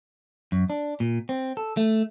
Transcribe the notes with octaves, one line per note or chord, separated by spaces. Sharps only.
F#2
D4
A#2
C4
A4
A3